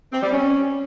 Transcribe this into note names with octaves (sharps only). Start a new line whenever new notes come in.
C4
G3
C#4